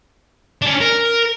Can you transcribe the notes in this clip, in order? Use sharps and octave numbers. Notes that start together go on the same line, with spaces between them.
C#4 D4
A#4